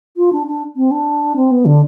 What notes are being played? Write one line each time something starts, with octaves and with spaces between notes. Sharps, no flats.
F4
D4
D4
C4
D4
C4
B3
D3